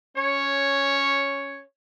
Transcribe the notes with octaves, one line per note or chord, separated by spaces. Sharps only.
C#4 C#5